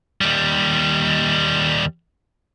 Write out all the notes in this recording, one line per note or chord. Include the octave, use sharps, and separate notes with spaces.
D#2 G3